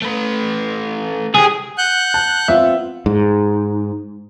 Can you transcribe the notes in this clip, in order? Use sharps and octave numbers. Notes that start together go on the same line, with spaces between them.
A3 B4
C2 G4 G#4
F#5 F#6 G6
A5
B3 C4 F4 E5
G#2